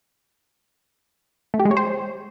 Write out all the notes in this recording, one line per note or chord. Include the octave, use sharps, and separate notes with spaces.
A3
G4
G#3
C#5
C5